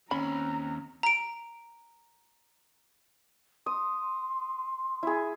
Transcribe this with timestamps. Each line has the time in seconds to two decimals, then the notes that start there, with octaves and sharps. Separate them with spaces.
0.11 D#2 C4 C#4 A#5 B5
1.03 A#5 D7
3.66 C6 D#6
5.03 E4 G#4